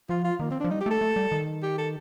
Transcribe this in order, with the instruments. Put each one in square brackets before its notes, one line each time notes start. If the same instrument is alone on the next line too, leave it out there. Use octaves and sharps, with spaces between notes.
[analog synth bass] F3 [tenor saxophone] F4
[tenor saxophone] F4
[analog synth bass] D#3 [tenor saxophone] A#3
[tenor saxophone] C4
D4
[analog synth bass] F3
[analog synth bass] G3 [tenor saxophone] D#4
[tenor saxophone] G4
[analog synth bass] A3 [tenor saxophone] A4
[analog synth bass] A3
G3
D#3
[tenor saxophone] G4
A4